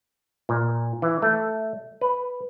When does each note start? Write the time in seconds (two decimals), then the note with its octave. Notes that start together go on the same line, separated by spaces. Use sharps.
0.49 A#2
1.02 E3
1.22 A3
2.01 B4